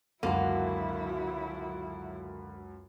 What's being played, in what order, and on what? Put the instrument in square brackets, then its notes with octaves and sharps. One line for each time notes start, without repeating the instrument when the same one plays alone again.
[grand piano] C#2 F#2 [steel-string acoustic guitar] D3 F#4 [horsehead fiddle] F#3 E4 [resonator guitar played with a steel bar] A#3